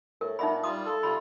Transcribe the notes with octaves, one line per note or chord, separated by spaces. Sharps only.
A2 A#4
A#2 B3 D#4 E5 B5
G3 F4 D#6
A4
C3 G3 F4 B5